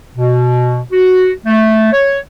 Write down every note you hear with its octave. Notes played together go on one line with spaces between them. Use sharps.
B2
F#4
A3
C#5